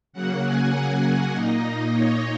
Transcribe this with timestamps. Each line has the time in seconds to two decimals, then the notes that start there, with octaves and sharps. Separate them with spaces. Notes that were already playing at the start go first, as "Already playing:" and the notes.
0.13 C#3 F#3 A#3 F#5
0.43 G#5
0.73 F#5
1.34 A#2 A#3 D#4 D#5
1.63 D#5
1.93 C#5